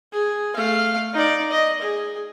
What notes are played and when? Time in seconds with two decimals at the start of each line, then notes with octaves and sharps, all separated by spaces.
0.13 G#4
0.56 A3 F5
1.14 D#4 D5
1.51 D#5
1.81 G#4